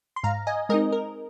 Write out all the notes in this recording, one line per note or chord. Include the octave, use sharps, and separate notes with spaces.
C6
G#2 F5 A#5
D#5 G#5
G#3 C4 D#4 A#4 D#5
A#4